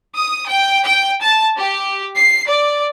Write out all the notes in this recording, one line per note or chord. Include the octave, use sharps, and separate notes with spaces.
D#6
G5
G5
A5
G4
C7
D5